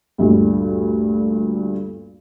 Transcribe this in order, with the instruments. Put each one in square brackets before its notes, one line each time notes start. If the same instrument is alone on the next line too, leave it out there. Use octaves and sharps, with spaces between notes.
[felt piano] D2 G2 A#2